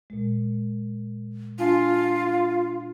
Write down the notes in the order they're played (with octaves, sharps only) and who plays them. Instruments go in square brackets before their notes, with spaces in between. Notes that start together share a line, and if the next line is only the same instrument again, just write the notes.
[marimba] A#2 G#3
[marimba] D4 G#5 A5 [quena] F4